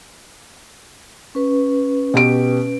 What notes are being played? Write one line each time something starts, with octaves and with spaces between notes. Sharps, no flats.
C#4 B4
B2 G4 D7